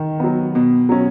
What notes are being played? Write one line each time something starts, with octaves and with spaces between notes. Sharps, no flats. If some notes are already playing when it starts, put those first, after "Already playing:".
Already playing: D#3
F#3 B3
B2
F#3 C#4